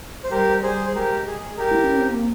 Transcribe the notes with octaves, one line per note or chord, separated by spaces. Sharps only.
C5
G3 G4 A#4
G3 G#4 C5
G#3 G4 A#4
G#4
G4 A#4
E4
C#4
C4
A#3